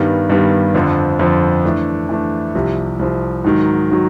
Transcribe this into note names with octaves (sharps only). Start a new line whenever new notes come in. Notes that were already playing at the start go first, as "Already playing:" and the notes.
Already playing: G2 D#3 G3 B3
G2 D#3 G3 B3
F2 D3 F3
F2 D3 F3
E3 A3 D4
E3 A3 D4
C2 C3 F3
C2 C3 F3
G#2 D#3 F#3
D#3 F#3